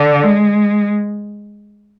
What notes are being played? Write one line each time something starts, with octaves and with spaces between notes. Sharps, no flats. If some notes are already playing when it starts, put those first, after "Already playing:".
Already playing: D3
G#3